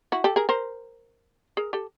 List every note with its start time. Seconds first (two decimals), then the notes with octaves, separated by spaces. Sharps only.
0.12 E4 F#4
0.24 G4 A4
0.36 G#4 A#4
0.49 A#4 C5
1.57 G#4 A#4
1.73 G4 A4